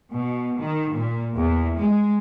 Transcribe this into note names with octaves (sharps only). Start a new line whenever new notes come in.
B2
D#3
A#2
E2
G#3